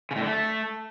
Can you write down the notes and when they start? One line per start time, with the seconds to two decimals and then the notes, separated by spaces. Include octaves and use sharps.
0.11 C#3
0.16 A2
0.21 D3
0.26 A3